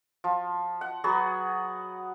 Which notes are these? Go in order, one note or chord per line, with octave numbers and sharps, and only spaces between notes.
F3
F#5
F#3 B3 F#4 G#4